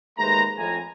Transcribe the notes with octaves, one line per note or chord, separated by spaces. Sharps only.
D#2 G#3 A3 B4 C5 A#5
F2 A2 G#5 A#5